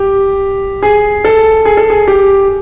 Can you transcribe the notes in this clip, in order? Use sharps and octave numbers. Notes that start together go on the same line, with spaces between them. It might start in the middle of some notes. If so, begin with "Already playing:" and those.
Already playing: G4
G#4
A4
G#4
A4
G#4
G4